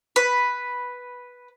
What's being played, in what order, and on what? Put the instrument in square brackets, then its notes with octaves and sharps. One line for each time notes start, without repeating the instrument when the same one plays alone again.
[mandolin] B4